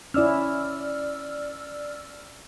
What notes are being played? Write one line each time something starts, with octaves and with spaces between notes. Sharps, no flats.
C#4 E4 D5 E6 F6